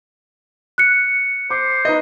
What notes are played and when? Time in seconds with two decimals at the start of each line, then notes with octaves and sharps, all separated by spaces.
0.78 F#6 C#7
1.51 C5 D6
1.85 D#4 B4 D#5